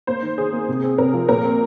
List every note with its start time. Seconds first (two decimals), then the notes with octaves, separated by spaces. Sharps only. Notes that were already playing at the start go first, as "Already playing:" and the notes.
0.07 A#3 C5
0.22 D#3
0.38 D#3 G#4
0.53 A#3
0.68 C3
0.84 C4
0.98 C3 A#4
1.13 F3
1.29 A#2 A#4
1.44 C4